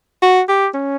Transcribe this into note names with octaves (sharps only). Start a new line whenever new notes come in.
F#4
G4
C#4